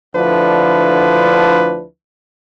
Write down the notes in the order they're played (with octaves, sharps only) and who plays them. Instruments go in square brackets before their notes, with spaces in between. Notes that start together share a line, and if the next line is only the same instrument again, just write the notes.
[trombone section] D2 D3 F3 D4 E4 B4